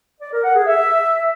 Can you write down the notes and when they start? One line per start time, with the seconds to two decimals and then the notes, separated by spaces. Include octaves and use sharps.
0.21 D5
0.32 A#4
0.44 F#5
0.55 G#4
0.66 E5